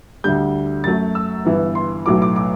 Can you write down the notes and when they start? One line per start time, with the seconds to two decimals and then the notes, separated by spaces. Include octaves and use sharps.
0.24 D2 D3 G3 G6
0.84 F#2 F#3 A3 A6
1.15 E6
1.45 G1 G2 E3 B3
1.75 C6
2.06 B1 A2 F#3 A3 D6
2.22 D6
2.36 D6